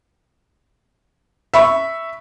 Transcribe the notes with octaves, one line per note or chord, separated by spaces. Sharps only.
E5 B5 C#6